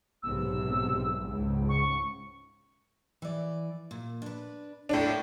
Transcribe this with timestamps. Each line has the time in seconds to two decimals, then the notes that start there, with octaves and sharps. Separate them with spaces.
0.23 B1 G#2 C3 E6
1.26 C#2 G#2
1.69 C#6
3.22 E3 D5
3.91 A#2
4.22 D4 B4
4.89 A2 A#3 D4 F4 F#5